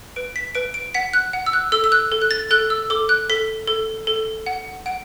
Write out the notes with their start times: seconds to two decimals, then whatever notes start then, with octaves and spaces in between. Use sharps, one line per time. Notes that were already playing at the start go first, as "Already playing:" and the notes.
0.16 B4 D7
0.36 B6
0.55 B4 D7
0.74 D7
0.94 F#5 B6
1.14 F#6
1.33 F#5
1.46 E6
1.53 F#6
1.72 A4 E6
1.84 E6
1.92 F#6
2.12 A4
2.22 F#6
2.31 A6
2.51 A4 F#6
2.70 E6
2.90 A4 D6
3.09 F#6
3.30 A4 B6
3.67 A4
4.07 A4
4.46 F#5
4.86 F#5 D7